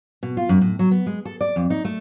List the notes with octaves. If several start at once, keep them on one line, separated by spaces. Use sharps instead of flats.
B2
F4
F#2
A2
F#3
B3
G#3
A4
D5
F2
D#4
A3